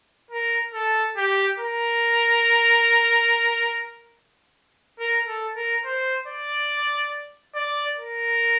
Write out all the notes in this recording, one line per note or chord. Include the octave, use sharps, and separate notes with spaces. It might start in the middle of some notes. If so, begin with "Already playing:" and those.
A#4
A4
G4
A#4
A#4
A4
A#4
C5
D5
D5
A#4